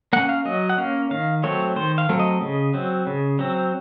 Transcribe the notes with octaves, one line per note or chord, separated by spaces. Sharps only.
A#3 C#4 F#5
F5
F#3 D#5
F#5
A#3 C#4 F5
D#3 F5
F#3 A3 C4 C#5
D#3 C5
F5
F#3 A3 C4
D#5
C#3
F#3 C4
C#3
F#3 C4